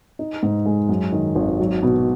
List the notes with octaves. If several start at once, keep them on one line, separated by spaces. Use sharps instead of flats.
D#4
G#2
G#3
F#2
D#3
G#1
F#3
B2